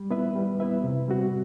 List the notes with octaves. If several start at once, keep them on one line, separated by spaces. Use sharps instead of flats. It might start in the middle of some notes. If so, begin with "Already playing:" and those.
Already playing: G3
B3 E4 B4 E5
G3
B3 E4 B4 E5
C3
G3 C4 F#4